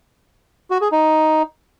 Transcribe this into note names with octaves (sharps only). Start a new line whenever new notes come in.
F#4
G#4
D#4